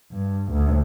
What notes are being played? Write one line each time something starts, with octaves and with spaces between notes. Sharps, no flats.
G2
D2